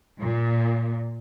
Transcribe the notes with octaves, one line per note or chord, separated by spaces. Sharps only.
A#2